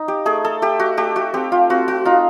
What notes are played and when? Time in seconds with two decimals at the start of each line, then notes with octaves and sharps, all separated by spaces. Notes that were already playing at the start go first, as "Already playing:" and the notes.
Already playing: D#4
0.08 G4
0.26 A3 G#4
0.45 A4
0.62 A3 G4
0.80 F#4
0.97 A3 G4
1.16 F#4
1.34 C4 G4
1.52 F4
1.70 C4 F#4
1.88 F#4
2.05 D#4 F4